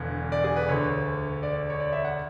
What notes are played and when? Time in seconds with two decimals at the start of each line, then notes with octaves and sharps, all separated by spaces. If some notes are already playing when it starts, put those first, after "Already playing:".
Already playing: E1 E2 D3
0.32 D5
0.44 G#4
0.56 B4
0.68 D2 D3 C#5
1.43 D5
1.70 C#5
1.80 D5
1.92 E5
2.04 F#5